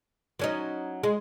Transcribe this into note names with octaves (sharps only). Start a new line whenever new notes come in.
F#3 C#4 D#4
G#3